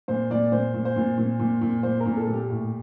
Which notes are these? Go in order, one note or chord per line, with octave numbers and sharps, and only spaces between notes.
A#2 C5
A#2 D5
A#2 C5
A#2
C5
A#2
A#2
A#2
A#2
A#2 C5
A#4
A#2
A4
A#2
G4
A2